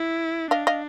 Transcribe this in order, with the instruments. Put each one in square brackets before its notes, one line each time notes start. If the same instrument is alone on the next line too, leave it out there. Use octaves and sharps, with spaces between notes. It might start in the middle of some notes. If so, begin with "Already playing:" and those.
Already playing: [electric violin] E4
[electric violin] D4 [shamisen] D#5 F5
[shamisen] D#5 F5